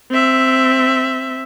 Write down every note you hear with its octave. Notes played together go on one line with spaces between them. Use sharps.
C4 E5